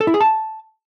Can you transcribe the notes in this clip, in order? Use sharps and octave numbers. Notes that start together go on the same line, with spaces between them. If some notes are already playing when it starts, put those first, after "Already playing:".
A4
E4
G#4
A5